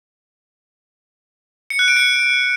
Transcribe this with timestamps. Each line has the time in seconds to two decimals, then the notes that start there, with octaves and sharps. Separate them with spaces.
1.70 C#7
1.79 F#6
1.88 D7
1.97 C#7